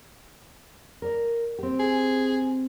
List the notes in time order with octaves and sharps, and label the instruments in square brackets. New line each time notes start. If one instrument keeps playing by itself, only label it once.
[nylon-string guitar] A#4 D5
C4 G4
[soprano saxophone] G#4